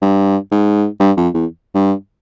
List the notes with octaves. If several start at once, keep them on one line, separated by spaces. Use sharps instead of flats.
G2
G#2
G2
F2
E2
G2